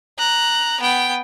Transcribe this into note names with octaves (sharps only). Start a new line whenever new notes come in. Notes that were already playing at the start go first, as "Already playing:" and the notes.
A#5 F#6
B3 G5